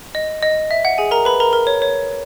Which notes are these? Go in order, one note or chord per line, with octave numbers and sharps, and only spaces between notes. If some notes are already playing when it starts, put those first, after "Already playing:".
D#5
D#5
E5
F#5
G#4 G#5
A#4 A#5
B4 B5
A#4 A#5
A#4 A#5
C#5
C#5